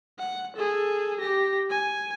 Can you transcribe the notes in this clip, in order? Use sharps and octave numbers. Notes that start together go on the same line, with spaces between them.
F#5
G#4 A4
G4 A#6
G#5